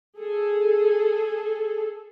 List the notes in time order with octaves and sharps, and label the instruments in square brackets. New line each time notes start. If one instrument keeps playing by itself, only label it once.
[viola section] G#4 A4